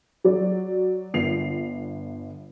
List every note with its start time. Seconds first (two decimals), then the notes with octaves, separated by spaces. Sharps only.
0.24 F#3 D5
1.14 G1 D3 C7 F7